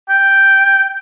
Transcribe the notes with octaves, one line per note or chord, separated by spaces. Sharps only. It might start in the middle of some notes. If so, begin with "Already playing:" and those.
G5